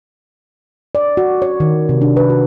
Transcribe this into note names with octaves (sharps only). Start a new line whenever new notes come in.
D5
F#4
C#5
D#3
C3
D4
B4
F#4